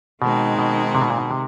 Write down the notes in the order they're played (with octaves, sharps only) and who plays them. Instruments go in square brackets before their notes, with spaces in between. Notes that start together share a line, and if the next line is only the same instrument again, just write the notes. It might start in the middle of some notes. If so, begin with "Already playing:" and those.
[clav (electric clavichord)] B2 [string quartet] D#3 G#3 C4 D#4
[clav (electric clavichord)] B2
C3
B2
A#2
B2
C3